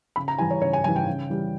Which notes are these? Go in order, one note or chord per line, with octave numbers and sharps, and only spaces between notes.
C#3 B5
A#5
E3 G3 G#5
C#5
C#3 C#5
G#5
E3 G3 G#5
G5
C#3
E3 G3